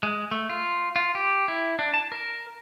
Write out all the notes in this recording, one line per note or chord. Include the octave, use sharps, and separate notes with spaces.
G#3
A3
F4
F4
G4
E4
D4
A5
A#4